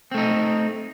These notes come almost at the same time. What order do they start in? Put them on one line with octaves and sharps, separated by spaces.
C4 A3 D#4